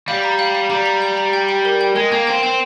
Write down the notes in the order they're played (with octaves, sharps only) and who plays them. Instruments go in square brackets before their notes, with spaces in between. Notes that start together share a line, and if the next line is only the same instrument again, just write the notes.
[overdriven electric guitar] G3 [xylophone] F5
[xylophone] A#5
F5
F5
[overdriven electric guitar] G3 [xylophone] A#5
[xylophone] A#5
G6
A#5
G5
G5
A#4
G5
[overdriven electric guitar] G#3 [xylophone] A#4
[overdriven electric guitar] A#3 [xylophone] G5
[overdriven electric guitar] C4 [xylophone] G5
[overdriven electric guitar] C4 [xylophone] G5